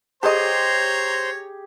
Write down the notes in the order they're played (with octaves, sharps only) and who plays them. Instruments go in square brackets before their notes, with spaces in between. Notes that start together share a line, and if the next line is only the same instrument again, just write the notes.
[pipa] F#3 D#5 [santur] G4 G#4 [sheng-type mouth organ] C5 C6 [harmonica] C#5 A#5